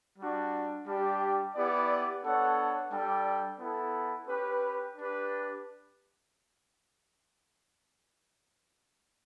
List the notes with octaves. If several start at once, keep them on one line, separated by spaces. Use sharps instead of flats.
G3 D4 F#4
G3 D4 G4
B3 E4 G4 D5
B3 D4 A4 C#5 F#5
G3 D4 A4 D5 G5
B3 E4 A4
C#4 G4 B4
D4 G4 B4